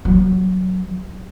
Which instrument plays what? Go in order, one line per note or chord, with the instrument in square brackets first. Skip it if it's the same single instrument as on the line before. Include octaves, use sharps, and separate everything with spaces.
[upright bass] F#3